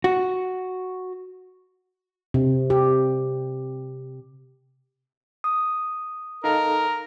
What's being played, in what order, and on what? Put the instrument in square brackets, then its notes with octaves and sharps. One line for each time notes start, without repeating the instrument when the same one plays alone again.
[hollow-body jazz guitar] F#4
[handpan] C3
G4
[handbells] D#6
[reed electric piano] D#4 A4 F5 [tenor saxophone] A#4